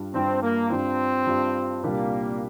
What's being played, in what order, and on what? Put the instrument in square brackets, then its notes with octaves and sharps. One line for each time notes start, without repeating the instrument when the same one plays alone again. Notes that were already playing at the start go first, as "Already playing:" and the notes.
Already playing: [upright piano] G2 G3 D4 F4
[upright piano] G2 G3 D4 F4 [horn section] C4
[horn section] A#3
[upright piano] G2 G3 D4 F4 [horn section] C4
[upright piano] G2 G3 D4 F4
[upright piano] C2 A#2 G3 D4 G4 [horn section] A#3